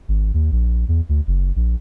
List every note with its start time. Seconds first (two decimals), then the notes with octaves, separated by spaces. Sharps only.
0.08 G#1
0.34 D#2
0.52 A#1
0.88 E2
1.09 D2
1.27 F#1
1.56 A#1